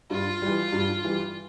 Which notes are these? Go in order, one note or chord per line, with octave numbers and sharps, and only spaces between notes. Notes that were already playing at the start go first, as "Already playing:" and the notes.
G2 F4
E3 G3
G2
E3 G3